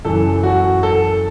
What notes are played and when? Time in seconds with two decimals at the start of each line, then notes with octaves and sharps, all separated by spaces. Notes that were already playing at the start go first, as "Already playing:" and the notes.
0.05 F#2 E3 A4
0.43 F#4
0.83 A4